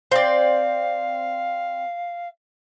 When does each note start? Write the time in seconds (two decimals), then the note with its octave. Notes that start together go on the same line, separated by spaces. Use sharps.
0.12 C4 D5 F5